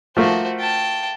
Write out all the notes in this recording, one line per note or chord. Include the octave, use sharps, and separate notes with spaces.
F3 A3 A#3 F#4 C5
G5 A5